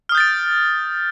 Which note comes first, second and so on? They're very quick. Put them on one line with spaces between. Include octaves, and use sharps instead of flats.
F6 D#6 G6 A6 D7